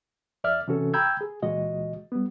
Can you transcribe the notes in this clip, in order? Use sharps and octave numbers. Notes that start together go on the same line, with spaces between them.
F2 D5 E5 F6
C3 E3 C#4 F#4 A4
G5 A#5 B5 E6 G6 G#6
G#4
C#2 A#2 E3 G#3 F#4 D#5
G3 B3